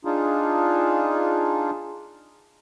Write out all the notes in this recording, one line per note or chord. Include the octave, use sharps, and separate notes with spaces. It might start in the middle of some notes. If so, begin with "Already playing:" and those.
D4 D#4 F4 G#4